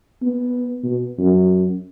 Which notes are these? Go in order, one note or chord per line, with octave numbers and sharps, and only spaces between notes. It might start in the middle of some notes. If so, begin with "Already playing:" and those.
B3
B2
F#2